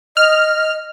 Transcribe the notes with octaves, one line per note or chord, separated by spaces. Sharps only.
D#5 F6